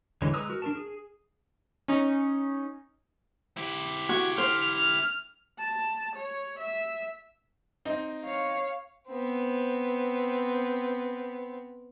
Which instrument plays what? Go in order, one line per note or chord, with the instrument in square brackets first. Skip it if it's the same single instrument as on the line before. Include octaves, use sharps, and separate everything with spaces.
[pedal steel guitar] D3 E3 G#3 C#5
G#3 B4 A#5 D#6 E6
F#4 A#4
D4 A#4 A5
G#4
[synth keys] C#4 D#4
[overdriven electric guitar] E4 G4
[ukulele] F#4 [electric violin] G#6
[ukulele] C5 [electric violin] F6
[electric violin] F6
[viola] A5
C#5
E5
[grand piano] C4 D#4
[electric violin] C#5 F5
[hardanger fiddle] B3 C4